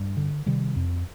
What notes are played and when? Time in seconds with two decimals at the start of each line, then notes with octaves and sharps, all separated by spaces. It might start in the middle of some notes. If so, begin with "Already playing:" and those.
Already playing: G2
0.17 D3
0.46 C3 D#3 G3
0.76 F2